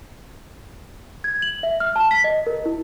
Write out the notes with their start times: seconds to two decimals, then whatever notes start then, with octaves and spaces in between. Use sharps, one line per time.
1.24 G#6
1.42 F#7
1.63 E5
1.80 F6
1.96 A5
2.11 B6
2.24 D#5
2.47 A#4
2.66 E4